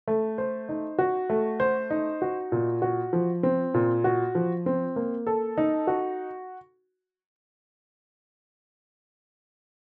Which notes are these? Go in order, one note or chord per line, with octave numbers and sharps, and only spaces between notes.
A3
C5
D#4
F#4
A3
C5
D#4
F#4
A#2
F#4
F3
C4
A#2
F#4
F3
C4
A#3
A4
D#4
F#4